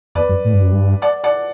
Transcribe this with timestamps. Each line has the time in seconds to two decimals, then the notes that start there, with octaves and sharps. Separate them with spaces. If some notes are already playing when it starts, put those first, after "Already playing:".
0.15 E2 B4 D5
0.29 F#2
0.45 A2
0.53 G2
0.62 F#2
0.72 G2
1.02 D5 F#5
1.24 D5 F#5